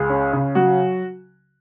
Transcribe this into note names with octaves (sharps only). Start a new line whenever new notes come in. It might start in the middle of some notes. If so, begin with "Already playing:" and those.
Already playing: C#2 G#4
C#4
C#3
F#3 F#4